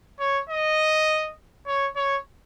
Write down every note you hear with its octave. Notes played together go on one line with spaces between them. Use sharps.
C#5
D#5
C#5
C#5